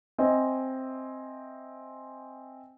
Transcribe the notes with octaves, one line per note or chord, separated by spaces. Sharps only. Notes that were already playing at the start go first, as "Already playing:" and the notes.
C4 C5 D#5 E5 G#5